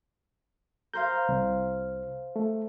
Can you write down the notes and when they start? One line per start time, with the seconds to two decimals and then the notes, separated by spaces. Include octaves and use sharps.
0.94 A#4 C5 F5 G6
1.29 C2
2.36 A3